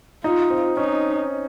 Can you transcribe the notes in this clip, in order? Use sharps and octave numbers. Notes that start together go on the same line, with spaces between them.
D#4 F4
C4
C#4 D#4